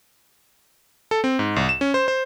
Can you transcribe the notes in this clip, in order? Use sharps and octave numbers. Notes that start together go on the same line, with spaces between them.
A4
C4
G#2
C2
E7
C#4
C5
C5